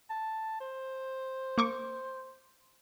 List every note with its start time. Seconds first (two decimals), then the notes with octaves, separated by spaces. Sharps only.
0.10 A5
0.61 C5
1.58 A#3 C#6 D6